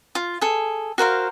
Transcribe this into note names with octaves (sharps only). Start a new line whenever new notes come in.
F4
G#4 A4
F#4 A#4 C5 F5